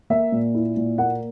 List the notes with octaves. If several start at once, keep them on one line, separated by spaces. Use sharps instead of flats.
A#3 E5
A#2
E4
A#2
A#3 F#5